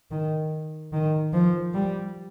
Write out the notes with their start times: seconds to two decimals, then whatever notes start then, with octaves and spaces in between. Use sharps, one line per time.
0.11 D#3
0.93 D#3
1.33 F3
1.74 G3